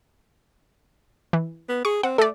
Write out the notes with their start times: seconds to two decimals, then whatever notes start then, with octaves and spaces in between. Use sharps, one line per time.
1.33 E3
1.69 B3
1.85 G#4 C#6
2.03 C4 F#5
2.18 A3 A4 D5